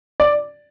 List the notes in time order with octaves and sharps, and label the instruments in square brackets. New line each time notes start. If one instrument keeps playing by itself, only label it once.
[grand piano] D5